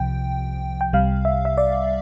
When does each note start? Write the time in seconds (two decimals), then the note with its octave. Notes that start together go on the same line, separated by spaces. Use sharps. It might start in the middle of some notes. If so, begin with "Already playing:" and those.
Already playing: C2 C3 F3 G5
0.81 G5
0.93 C2 C3 G3 F5
1.25 E5
1.45 E5
1.57 D5